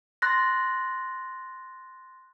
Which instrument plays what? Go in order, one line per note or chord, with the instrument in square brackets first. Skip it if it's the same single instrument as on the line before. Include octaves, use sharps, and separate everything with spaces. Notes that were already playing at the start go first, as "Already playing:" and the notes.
[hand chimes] C6 F#6 A6 A#6